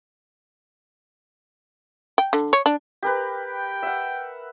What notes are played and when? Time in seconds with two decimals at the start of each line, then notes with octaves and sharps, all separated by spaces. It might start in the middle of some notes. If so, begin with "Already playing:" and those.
2.18 G5
2.33 D3
2.53 C#5
2.66 D4
3.03 G4 A#4 B4
3.46 G5
3.83 E5 F#5